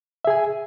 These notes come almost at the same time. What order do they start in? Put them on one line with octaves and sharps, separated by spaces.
E5 G#4 G#5